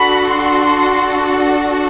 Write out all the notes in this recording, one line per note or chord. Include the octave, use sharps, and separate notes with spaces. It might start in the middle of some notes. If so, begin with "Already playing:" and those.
Already playing: D4 F#4 A4 B5
C6